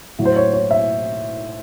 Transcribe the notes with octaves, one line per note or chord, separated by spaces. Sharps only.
A2 F#3
C5
C#5
C#5
E5